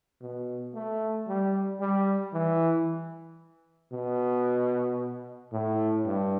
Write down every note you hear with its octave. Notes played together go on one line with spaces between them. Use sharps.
B2
A3
G3
G3
E3
B2
A2
G2